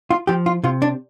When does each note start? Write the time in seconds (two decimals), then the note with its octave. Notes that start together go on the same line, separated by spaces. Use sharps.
0.11 F4
0.27 F3 G4
0.46 F4
0.64 C3 F4
0.82 D4